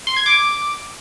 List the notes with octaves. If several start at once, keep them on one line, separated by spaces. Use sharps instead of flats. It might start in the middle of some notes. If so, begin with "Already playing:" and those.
C6
G#6
D6